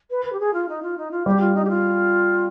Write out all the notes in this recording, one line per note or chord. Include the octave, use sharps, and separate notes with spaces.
B4
B4
G4
G#4
F4
D#4
F4
D#4
F4
G3 G4
F4
D#4
G4
F4